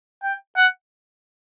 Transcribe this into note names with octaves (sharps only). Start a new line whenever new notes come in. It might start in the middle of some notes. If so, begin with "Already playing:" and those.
G5
F#5